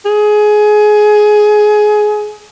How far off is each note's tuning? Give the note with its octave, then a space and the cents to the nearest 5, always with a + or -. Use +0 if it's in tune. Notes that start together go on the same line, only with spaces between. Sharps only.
G#4 +20